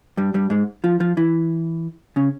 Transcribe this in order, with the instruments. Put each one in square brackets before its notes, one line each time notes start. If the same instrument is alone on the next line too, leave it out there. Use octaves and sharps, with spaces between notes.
[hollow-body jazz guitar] G2 G3
G2 G3
G#2 G#3
F3 F4
F3 F4
E3 E4
C#3 C#4